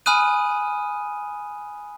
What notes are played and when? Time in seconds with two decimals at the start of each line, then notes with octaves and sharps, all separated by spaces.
0.06 G#5 B5 D#6 F6 F#6 D#7